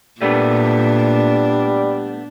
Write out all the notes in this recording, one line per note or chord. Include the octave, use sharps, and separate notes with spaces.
A#2 G3 A3 B3 D4